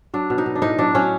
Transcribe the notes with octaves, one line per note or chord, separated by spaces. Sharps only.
F#3 D4
B2
D#4
B2
D4
A2 D#4
F#3 D4
F#3 C#4